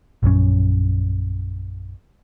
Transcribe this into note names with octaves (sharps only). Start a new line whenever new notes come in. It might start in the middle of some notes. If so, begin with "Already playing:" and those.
A#1 F#2 C#4